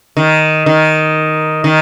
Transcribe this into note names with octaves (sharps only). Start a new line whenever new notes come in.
D#3
D#3
D#3